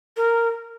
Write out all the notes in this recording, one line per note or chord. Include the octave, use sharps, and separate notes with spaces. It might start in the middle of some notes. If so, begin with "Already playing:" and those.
A#4